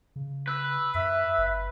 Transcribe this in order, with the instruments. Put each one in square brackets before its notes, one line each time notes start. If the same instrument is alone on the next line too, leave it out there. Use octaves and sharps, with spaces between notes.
[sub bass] C#3
[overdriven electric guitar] B4 [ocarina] E6
[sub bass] F#2 [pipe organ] E5 [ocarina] E6
[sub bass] G1